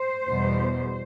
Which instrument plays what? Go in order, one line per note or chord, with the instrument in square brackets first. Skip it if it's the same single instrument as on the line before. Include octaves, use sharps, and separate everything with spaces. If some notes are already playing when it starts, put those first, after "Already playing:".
Already playing: [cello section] C5
E2 B2 G3